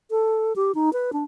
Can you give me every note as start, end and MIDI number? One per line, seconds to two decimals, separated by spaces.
0.11 0.53 69
0.56 0.72 67
0.75 0.92 63
0.93 1.11 71
1.13 1.24 62